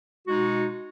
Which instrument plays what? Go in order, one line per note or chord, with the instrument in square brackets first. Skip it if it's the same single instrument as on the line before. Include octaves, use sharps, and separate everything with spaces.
[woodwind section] B2 G#3 D#4 F#4